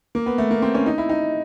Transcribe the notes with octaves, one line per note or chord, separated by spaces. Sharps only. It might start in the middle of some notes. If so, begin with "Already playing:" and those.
A#3
B3
A3
A#3
C4
C#4
D#4
E4
D#4